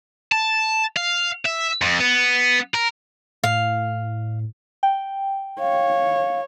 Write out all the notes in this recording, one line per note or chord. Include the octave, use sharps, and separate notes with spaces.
A5
F5
E5
F2
B3
A#4
A2 F5
G5
C#5 F5